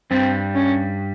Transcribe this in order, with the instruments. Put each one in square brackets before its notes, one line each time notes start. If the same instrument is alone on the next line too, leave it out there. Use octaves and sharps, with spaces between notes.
[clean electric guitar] G2 G3 [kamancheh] C4
[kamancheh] C#4